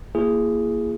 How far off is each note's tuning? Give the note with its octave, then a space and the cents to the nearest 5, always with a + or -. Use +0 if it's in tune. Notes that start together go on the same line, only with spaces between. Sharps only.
A#3 +0 E4 +45 G#4 +0